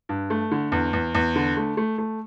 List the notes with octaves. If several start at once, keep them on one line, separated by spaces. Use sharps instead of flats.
G2
A3
D3
E2
E2
E2
D3
A3
A3
A3